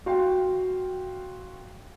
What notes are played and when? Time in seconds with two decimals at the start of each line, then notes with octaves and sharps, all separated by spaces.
0.06 F#4 F5 G5 C6